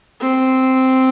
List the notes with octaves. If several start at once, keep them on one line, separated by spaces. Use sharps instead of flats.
C4